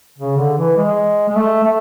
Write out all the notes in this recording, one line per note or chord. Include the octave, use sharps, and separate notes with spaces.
C#3
D3
E3
G#3
G#3
A3
A3